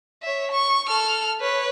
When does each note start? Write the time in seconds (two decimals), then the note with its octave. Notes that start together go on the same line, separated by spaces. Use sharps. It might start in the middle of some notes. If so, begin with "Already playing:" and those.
0.22 C#5 E5
0.52 C#6
0.88 A4 F6
1.41 B4 C#5